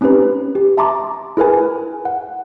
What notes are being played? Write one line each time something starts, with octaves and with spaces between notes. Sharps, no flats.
C4 C#4 D#4 G4 B4
G4
E5 A5 A#5 C6 D6
E4 G#4 A#4 B4 G#5
F#5